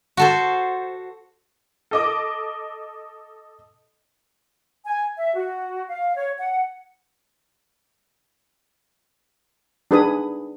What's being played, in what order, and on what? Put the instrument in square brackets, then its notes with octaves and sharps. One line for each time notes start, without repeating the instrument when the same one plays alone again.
[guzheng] F#4 A4 C5
[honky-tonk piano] A4 D#5 D6
[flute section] G#5
E5
F#4
F5
C#5
F#5
[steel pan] D4 D#4 G#4 B4 B5 D#6